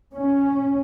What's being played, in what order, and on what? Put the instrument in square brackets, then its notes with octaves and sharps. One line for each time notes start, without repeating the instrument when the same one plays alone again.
[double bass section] C#4